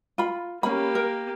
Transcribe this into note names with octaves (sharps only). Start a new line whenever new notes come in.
F4 B5
A#3 C#4 G4 B5
A#4